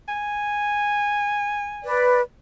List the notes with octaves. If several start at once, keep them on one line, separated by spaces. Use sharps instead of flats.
G#5
B4 D5